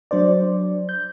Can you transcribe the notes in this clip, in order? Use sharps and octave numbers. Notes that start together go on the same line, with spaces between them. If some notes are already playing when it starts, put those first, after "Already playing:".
F#3 D4 C5 D5
G6